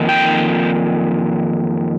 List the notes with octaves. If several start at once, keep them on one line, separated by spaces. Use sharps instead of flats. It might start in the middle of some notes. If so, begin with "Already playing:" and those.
Already playing: F2 D#3 A#3 D#4
G5